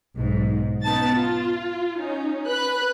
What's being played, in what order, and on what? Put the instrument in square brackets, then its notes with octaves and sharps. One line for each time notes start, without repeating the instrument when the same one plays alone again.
[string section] B1 G#2
B3 C#4 D#4 A5 A6
F4
C#4 D#4
B4 B5 F#6